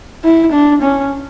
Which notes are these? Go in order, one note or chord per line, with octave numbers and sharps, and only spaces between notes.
E4
D4
C#4